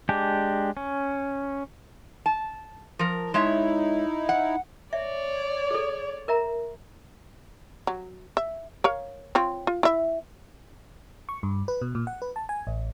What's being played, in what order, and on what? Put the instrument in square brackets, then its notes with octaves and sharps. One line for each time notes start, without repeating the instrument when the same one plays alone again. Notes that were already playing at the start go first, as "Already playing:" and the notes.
[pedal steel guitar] G#3 D4 G4
C#4
[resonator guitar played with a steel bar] A5
F3 A#4
[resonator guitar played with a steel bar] G#3 C#5 E5 [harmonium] D#4 E4
[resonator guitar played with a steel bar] F#5
[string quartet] C#5 D5 [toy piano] E5
[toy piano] G#4 A4
A#4 E5 A#5
[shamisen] F#3
E5
A#4 C#5 F5
C4 F4 C#5
F4
E4 E5
[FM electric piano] C#6
G2
B4
B2
A#2
F#5
B4
A5
G#5
A1